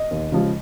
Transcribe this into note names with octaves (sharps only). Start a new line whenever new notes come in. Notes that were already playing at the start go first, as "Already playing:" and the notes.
Already playing: D#5
D#2
C#3 F3 G#3